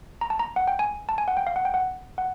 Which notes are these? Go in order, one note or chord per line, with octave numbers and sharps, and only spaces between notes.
A#5
A5
A#5
F#5
G5
G#5
A5
G#5
F#5
G5
F5
F#5
G5
F#5
F#5